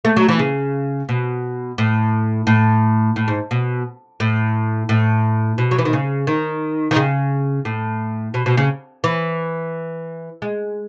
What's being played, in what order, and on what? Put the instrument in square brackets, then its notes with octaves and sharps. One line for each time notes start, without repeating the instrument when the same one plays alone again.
[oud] A3
F#3
E3
C#3
B2
A2
A2
A2
G#2
B2
A2
A2
B2
F#3
E3
D#3
C#3
D#3
D#3
C#3
A2
B2
B2
C#3
E3
G#3